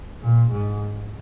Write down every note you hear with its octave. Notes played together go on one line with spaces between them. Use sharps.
A#2
G#2